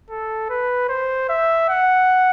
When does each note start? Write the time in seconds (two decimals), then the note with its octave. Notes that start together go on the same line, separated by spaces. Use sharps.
0.10 A4
0.50 B4
0.89 C5
1.29 E5
1.69 F#5